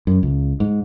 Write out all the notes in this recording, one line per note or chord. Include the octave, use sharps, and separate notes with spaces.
F#2
C#2
G#2